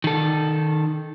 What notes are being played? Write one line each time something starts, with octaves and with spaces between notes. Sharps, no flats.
D#3 A4